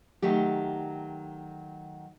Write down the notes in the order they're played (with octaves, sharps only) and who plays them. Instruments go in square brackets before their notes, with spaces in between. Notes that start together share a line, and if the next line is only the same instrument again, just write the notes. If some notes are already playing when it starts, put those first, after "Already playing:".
[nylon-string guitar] D#3 F#3 A3 G4